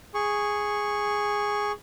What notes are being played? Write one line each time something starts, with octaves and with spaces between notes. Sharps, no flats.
G#4 C#6